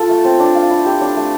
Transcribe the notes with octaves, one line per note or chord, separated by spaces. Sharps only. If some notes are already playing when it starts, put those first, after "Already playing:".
Already playing: F4 A4
A3
C4
D4
F5
E4
G4
D4
A3